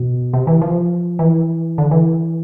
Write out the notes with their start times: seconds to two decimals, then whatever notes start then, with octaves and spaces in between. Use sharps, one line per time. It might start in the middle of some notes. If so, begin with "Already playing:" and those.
Already playing: B2
0.33 C3
0.47 E3
0.62 F3
1.19 E3
1.78 D3
1.91 E3